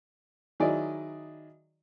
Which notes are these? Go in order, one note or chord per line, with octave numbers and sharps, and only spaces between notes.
D#3 F#3 E4 G#4 D5 D#5